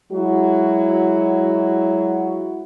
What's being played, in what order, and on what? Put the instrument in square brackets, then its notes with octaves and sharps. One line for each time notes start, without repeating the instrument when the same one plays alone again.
[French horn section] F#3 G#3 E4 F#4